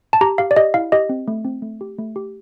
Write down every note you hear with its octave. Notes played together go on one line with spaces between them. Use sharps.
A5
G4 A#5
G4 F5
D5
G4 D#5
E4 F5
G4 D#5
C4
A3
C4
A3
G4
A3
G4